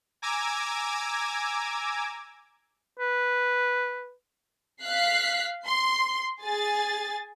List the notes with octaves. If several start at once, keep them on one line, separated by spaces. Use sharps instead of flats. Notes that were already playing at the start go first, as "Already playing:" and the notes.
G#5 A#5 D6 E6 G#6
B4
F5 F#6 B6 C7
C6
G#4 G#5 A6